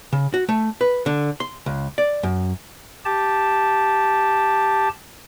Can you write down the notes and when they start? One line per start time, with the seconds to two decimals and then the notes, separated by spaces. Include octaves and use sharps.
0.12 C#3
0.34 F#4
0.49 A3
0.81 B4
1.06 D3
1.40 C6
1.66 C#2
1.98 D5
2.23 F#2
3.05 G4 A5